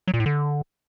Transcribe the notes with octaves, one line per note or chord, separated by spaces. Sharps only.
F#3
A#2
A2
D3